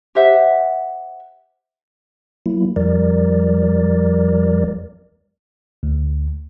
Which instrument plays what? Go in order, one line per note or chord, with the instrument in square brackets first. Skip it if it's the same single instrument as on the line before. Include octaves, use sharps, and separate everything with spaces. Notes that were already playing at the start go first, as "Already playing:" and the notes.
[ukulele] G4 C5 E5 F#5
[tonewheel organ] F#3 A#3 E4
F2 F3 G3 A#4 D5
[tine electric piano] D2